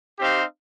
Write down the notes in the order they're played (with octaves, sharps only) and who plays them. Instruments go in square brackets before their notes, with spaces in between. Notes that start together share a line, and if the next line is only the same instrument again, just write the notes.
[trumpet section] C4 D#4 G4 C5 F5